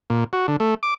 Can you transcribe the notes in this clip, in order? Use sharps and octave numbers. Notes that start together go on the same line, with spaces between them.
A#2
F#4
D3
A3
D6